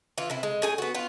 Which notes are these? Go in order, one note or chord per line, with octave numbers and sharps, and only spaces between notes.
E3 F4
C3 E4
G#3
A2 G#4 G#5
B3 F#4
B3 F4